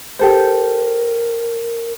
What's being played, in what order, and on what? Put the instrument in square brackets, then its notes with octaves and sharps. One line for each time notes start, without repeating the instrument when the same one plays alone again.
[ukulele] G4 A4 C5 [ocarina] A#4